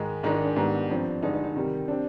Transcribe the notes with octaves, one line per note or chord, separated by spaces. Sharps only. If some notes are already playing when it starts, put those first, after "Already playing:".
Already playing: G#2 D#3 G#3
G#2 D#3 G#3 D4 D#4
D#4
D4
G#2 D#3 G3 B3
G2 F3 C4
G2 D3 G#3 D#4
D#4
D#4
C3 D#3 G3
G3 C4 D4